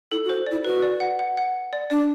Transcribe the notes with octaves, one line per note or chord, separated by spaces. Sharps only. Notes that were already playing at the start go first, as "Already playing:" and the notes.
E4 A4
F#4
C5
E4 D5
F#4 B4
D5
F#5
F#5
F#5
D5
D4 D5